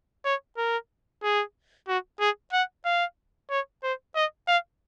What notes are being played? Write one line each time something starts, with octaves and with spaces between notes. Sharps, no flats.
C#5
A#4
G#4
F#4
G#4
F#5
F5
C#5
C5
D#5
F5